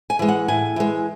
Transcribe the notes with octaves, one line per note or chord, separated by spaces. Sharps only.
G#5
E3 G#3
F#5
A2 G#5
E3 G#3